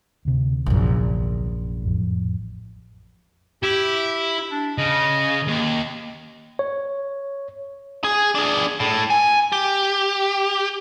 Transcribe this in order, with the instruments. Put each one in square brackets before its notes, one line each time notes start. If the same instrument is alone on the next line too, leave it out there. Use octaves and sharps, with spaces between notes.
[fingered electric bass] D2 C3
[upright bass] A#1 F#2
[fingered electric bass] A1 F2
[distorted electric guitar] E4 [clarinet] G4
[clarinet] D4
[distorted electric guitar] C#3 [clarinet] D#5
[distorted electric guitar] D#2
[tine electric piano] C#5
[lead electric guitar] G#4
D4 G#4
A2
G#5
G4